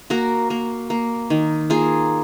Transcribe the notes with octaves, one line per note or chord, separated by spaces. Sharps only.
A#3 F#4 A#4
A#3
A#3
D#3
A#3 F4 G#4